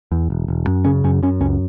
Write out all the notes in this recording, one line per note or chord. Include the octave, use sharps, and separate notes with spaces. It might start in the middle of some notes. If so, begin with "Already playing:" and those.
E2
E1
E1
F#2
C#3 C#4
F#2 C#4
F#2 C#4
C#2 C#4